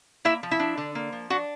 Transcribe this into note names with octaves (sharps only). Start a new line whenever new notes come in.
A#3 E4 E5
F3
E4 E5
D4
D3
A#3
F3
D4 F#4 F#5